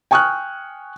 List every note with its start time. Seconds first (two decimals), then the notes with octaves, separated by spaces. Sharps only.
0.11 G5 G#5 C#6 D#6 F6 F#6